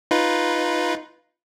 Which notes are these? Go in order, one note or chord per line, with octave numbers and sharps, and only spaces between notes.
D#4 F4 B4